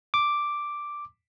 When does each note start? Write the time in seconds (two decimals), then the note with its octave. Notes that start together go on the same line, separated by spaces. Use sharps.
0.14 D6